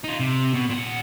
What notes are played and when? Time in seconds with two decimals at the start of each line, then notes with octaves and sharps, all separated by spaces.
0.04 D#4 F4
0.20 C3
0.54 B2
0.70 A#2 F#5